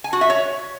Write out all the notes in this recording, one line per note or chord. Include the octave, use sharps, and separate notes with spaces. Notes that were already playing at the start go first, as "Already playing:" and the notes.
G#5
F#4
E5
C#5